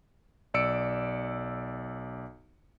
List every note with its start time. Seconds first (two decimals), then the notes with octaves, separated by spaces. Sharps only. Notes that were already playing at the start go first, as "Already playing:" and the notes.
0.54 B1 D5 E6 C#7 D7